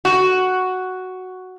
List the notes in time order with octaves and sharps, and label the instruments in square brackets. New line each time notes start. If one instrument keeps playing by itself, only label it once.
[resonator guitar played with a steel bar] F#4